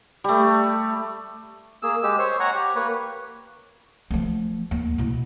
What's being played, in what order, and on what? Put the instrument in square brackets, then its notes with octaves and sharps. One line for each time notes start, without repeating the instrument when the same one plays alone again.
[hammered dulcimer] G3 A3
[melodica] A#3 G#4 E6
G#3 G4 E6
C5 C#5
C#5 F#5 G#5 A#5
G4
A#3 B4 C#5
[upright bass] F3 A3
D#2
B2 E4